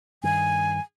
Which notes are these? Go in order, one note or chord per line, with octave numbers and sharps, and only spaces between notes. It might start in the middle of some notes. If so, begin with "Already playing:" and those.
G2 D#3 G#5